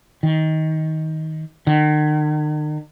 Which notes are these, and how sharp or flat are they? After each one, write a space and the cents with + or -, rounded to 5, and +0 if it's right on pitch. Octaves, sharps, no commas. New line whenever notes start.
D#3 +20
D#3 -45